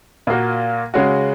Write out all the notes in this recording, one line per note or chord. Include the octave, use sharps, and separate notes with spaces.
A#2 A#3 F#4
C#3 G#3 C#4 F#4